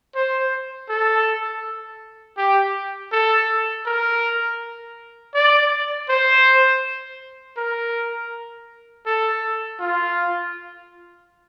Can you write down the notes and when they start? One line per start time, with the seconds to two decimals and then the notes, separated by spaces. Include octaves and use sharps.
0.15 C5
0.89 A4
2.37 G4
3.12 A4
3.86 A#4
5.34 D5
6.09 C5
7.57 A#4
9.06 A4
9.80 F4